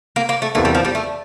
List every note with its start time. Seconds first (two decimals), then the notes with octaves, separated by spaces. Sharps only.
0.16 A#3
0.29 A#3
0.42 A3
0.55 E2 C3 E3 A3 A#3 D4
0.65 G3
0.75 F3
0.85 G3
0.95 A3